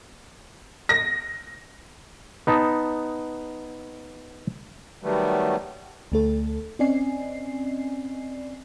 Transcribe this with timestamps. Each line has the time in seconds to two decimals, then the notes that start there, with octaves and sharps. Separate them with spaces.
0.89 A#6
2.47 B3 D#4 A5
5.03 D#3 F#3 G3 A3 B3
6.12 D2 A3 A4
6.79 C4 C#4 D5 D#5 G#5 C7